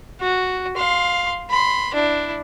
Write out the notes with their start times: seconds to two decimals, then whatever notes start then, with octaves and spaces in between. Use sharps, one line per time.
0.20 F#4
0.77 F5 C6
1.50 B5 C6
1.94 D4 E4